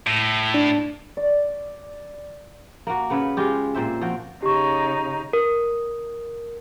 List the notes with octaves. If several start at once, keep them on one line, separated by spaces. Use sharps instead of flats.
A2
D4
D5
A#3 F#4
C#3 B4 F#5
G#3 F4 G4
A#2 C4 C5 E5
F3 F#4 G5
C#3 D#4 G4 C#6
A#4